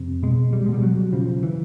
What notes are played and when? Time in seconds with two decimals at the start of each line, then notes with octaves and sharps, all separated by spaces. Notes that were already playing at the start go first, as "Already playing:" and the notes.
Already playing: F2 C3
0.23 B2 G#3
0.53 G3
0.66 B2 G#3
0.74 G3
0.83 F#3
1.13 C#3 F3
1.43 E3